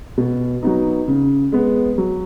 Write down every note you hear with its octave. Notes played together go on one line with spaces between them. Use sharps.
B2
F#3 B3 D#4
C#3
G#3 B3
F#3